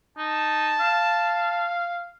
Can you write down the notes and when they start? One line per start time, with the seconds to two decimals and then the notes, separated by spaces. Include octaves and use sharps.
0.18 D#4 A5
0.80 F5